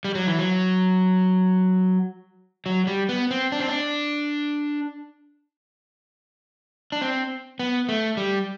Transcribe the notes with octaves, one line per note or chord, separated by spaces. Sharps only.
G3
F#3
E3
F#3
F#3
G3
B3
C4
D4
C4
D4
D4
C4
B3
A3
G3